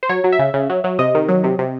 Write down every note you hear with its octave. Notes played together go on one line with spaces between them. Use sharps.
C5
F#3 C#5
F#3
E5
C#3
C#3
F#3
F#3
C3 D#5
D#3
F#3
C3
C3